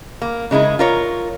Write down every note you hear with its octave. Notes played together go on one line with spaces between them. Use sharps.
A#3
C#3 G#3 D#4 E4
F4 A#4 C#5